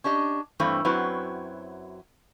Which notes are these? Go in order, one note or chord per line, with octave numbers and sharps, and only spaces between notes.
C#4 D4 G4 D#5
G2 E3 A3 C4
F#2 F#3 C4 E4 B4